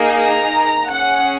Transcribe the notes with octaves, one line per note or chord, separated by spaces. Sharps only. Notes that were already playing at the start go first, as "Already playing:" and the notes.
Already playing: A#3 D#4 G#4
A#5
C#4 G#4 F#5